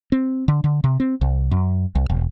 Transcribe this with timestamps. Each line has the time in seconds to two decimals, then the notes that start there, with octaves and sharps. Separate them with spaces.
0.12 C4
0.48 D3
0.64 D3
0.84 C3
1.00 C4
1.21 C2
1.51 F#2
1.95 C2
2.10 E1